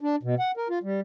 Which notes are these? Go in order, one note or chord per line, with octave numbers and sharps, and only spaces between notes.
D4
B2
F#5
A#4
F4
G3